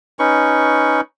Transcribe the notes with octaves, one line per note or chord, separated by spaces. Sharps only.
C#4 D#4 B4 C#6